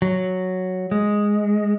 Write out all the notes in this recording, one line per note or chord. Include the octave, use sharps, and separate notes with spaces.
F#3
G#3